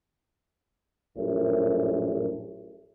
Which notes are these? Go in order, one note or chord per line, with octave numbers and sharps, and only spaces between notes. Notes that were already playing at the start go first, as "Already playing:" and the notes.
A#1 F#2 A2